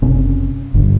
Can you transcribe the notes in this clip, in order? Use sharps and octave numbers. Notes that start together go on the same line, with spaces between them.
F#1 C3 C#4
G1 G2 D3